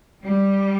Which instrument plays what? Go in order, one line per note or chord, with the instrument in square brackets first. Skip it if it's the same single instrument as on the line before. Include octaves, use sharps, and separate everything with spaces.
[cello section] G3